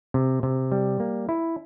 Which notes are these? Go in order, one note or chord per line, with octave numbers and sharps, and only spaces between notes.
C3
C3
G3
A#3
E4